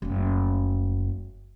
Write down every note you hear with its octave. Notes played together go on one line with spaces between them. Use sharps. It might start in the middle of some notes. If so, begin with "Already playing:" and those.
F#1 A3